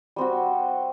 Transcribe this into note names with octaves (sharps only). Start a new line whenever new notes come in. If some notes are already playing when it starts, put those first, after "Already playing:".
G3 C4 F#4